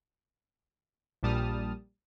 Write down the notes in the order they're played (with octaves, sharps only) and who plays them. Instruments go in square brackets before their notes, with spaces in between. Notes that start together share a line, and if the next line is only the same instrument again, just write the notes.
[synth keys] A#1 A#2 G3 A5 D#6 F6